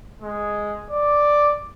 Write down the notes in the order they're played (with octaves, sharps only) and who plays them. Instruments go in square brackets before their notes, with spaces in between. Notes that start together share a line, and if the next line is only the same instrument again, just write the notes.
[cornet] G#3
D5